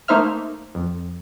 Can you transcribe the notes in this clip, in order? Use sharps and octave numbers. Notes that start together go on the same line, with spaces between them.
A3 A#3 D#4 C5 E5 F6
F2